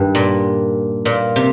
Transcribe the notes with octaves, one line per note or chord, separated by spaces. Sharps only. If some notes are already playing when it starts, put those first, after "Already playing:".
Already playing: G2 D#3
A#2
A#2
C3